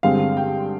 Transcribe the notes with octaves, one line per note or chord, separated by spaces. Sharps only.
G2 D3 G#3 C4 F5
G5